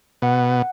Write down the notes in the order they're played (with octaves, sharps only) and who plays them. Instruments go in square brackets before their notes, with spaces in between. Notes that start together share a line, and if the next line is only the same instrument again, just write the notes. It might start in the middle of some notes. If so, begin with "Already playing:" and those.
[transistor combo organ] B2 [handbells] F#5